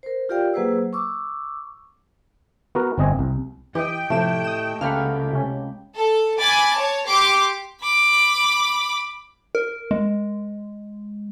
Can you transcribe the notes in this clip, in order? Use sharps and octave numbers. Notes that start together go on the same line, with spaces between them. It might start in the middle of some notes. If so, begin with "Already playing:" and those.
A#4 C5
F4 G4 A#4 D5 F5 G5
F#3 A#3 G#4 B4 C5 E6
C#6 D6 E6
B3 F#4 A#4
G1 C4 D#5 G#5
C2
E3 G4 D#5 G5
A2 C3 F3 A3 E7
D#6 E7
C#2 C#3 A3 A#3 F#5 G5 B5 F6
C3 C#4
A4
G#5 B5 D6 A6
C#5 A5
G4 C6 D6
B5 D6
A#4
G#3